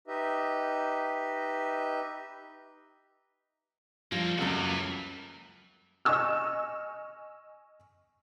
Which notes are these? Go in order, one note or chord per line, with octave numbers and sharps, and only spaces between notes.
D#4 G4 B4 D#5 E5
F3 G3 A#3 F4 A4
C#2 F#2 A3 A#3 F#4 A4
E3
D#5 G#5 C#6 E6 F6